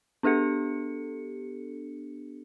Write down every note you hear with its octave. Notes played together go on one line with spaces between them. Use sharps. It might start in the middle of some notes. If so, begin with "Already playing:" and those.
B3 D4 G4 A4 C#7